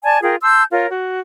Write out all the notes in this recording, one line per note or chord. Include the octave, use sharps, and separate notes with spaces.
D5 G#5 A5
F4 G#4 A#4 G5
A5 C6 E6 G6
F4 A#4 C#5
F#4